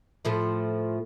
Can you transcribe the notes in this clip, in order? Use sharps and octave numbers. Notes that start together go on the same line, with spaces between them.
A2 F3 A3